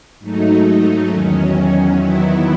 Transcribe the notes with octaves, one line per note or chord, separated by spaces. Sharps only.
G#2 F#3 A3 D#4
E2 D#3 F#3 C#4
E2 D#3 F#3 B3 E4